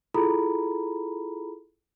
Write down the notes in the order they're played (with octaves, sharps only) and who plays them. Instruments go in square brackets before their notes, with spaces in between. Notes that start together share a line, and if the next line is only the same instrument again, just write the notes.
[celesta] E4 F4 G#4 A4 A#5 B5